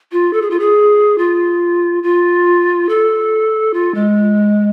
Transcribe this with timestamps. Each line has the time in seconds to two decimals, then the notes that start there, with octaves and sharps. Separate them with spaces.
0.12 F4
0.33 A4
0.42 G#4
0.50 F4
0.60 G#4
1.18 F4
2.03 F4
2.89 A4
3.74 F4
3.95 G#3